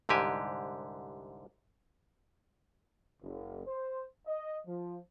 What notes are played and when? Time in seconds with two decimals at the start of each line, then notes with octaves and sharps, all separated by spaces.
0.09 C2 G#2 D3 G4 G#5
3.22 F#1
3.66 C5
4.26 D#5
4.66 F3